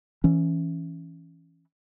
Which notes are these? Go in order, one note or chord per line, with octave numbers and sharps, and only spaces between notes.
E3 C#4